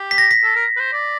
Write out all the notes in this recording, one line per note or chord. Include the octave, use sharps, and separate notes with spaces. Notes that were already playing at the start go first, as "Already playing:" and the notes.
Already playing: G4
B6
A#6
B6
A4
A#4
B4
C5
D5